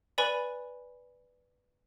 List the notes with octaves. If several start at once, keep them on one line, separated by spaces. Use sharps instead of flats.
B4 D5 G#5 B5